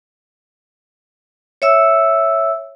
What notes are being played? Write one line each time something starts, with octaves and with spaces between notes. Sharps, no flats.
C#5 E5 E6